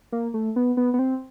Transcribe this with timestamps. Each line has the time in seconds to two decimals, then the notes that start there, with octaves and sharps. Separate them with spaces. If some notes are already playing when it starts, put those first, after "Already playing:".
0.12 A#3
0.34 A3
0.56 B3
0.77 B3
0.94 B3
0.99 C4